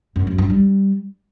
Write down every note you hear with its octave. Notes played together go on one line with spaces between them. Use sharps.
F#2
F#2
G2
G3